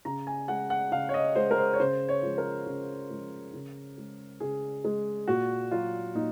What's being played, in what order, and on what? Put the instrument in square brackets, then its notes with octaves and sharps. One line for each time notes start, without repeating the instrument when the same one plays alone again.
[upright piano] C#3 A#5
G#5
G#3 F#5
F#5
C#3 F5
C#5
D#5
G#3 C5
A#4
C5
C#5
C#3 C5
C#5
F3 G#3
A#4
C#3
F3 G#3
C#3
G#3
C#3 G#4
G#3
A#2 F#4
F#3 F4
A#2 D#4